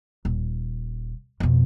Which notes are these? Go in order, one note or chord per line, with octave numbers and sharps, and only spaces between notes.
D#1
F2 B2